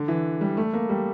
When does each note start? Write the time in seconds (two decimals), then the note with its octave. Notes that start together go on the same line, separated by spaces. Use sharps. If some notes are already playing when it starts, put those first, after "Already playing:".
Already playing: D3
0.08 E3
0.41 G3
0.57 A3
0.73 A#3
0.89 G3